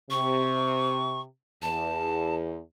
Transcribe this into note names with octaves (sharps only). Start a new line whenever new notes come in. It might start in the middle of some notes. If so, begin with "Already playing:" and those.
C3 C#6
E2 A5